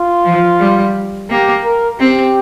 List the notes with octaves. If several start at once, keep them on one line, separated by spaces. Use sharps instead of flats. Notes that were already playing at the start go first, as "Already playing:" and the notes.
Already playing: F4
F3
G3
A#3 G4
A#4
C4 G4